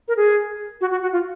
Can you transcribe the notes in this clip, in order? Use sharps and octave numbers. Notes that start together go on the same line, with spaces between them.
A#4
G#4
F#4
F#4
F#4
F4